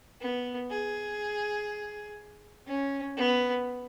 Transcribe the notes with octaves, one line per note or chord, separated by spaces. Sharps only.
B3
G#4
C#4
B3